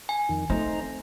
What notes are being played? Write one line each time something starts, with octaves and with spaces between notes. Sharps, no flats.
G#5
F2 D#3
A3 C4 D#4 C5 A#5